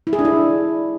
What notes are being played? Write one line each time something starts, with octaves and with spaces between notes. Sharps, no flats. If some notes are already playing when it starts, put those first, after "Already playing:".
E4
G#4
D4
E4